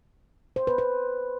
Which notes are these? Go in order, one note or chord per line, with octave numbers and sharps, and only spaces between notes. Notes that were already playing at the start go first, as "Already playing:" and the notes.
C5
B4
B4